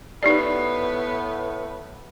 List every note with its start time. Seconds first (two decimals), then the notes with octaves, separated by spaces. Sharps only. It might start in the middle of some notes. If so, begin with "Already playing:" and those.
0.23 A2 B3 D#4 G4 B4 D5